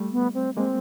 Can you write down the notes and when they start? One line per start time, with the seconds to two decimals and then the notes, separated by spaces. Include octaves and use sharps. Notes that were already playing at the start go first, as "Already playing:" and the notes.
Already playing: G3 A3
0.12 B3
0.34 C4
0.57 G#3 A#3 C4